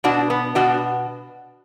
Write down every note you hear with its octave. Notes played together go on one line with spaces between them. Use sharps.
B2 D4 F#4
B3
B2 D4 F#4